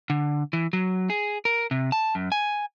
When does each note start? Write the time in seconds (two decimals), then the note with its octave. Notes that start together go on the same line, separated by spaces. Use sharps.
0.10 D3
0.53 E3
0.73 F#3
1.10 G#4
1.45 A#4
1.71 C3
1.92 A5
2.15 F#2
2.32 G#5